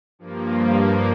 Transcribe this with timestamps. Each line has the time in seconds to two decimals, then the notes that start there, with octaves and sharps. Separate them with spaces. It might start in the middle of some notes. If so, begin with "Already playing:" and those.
0.19 G2 F3 A#3